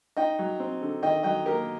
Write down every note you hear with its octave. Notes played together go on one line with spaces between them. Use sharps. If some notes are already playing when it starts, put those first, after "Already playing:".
D#4 D#5 G5
F#3
C4
D3
D#3 D#5 G5
F#3 D#5 G5
A#3 G4 A#4